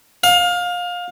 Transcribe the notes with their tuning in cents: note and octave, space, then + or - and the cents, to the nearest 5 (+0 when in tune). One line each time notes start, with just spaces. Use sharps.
F5 +25